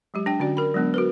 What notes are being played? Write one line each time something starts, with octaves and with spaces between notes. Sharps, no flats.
F#3 G#3 G4
D4 G5
D3 C#4 F#4 D5
A#4 B5
F#3 G#3 B3 D4
F#4 A#4 B4